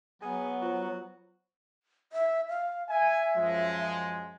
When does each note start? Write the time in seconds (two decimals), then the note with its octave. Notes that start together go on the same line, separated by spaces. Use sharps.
0.22 F#3 B3 G#4
0.62 F4 F#4 C5
2.13 E5
2.49 F5
2.89 E5 G#5
3.37 F#2 F3 G#3